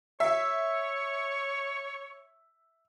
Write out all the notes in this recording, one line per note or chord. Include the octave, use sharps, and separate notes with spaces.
C#5 E5